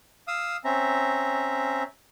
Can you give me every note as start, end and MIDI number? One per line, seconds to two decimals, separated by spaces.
0.28 0.57 77
0.28 0.57 87
0.28 0.57 88
0.65 1.83 60
0.65 1.83 61
0.65 1.83 76
0.65 1.83 82